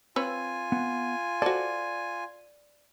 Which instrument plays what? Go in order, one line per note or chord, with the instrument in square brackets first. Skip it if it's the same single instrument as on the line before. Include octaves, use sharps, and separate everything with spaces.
[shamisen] C4 B4 C#5 [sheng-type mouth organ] F4 G#5
[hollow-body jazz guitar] B3
[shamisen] F#4 A4 [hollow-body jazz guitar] C5 D5